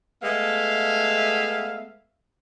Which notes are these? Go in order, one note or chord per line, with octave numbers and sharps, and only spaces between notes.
G#3 A3 B3 E5 F5